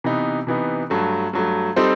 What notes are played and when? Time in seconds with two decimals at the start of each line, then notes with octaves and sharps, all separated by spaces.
0.04 C3 E3 B3 D#4
0.47 C3 E3 B3 D#4
0.90 G2 F#3 A3
1.33 G2 F#3 A3
1.76 G3 C4 D#4 A4 C5